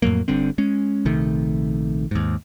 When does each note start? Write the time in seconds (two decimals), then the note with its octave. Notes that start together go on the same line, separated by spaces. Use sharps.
0.02 F2 A2 F#3 A#3
0.28 G1 G2 D3 C4
0.58 G#3 C#4
1.05 A#1 C3 D#3 A3
2.11 D#2 G#2